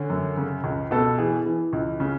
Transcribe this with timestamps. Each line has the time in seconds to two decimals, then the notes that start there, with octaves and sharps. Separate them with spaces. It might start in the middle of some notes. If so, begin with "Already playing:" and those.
Already playing: D3 C#4
0.10 F#2
0.37 C#3
0.64 C#2
0.91 B2 A4
1.18 E3 G#4
1.45 E3
1.73 C#2
2.00 C#3